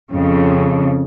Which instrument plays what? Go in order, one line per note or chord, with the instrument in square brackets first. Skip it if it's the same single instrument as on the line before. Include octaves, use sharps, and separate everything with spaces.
[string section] F2 C#3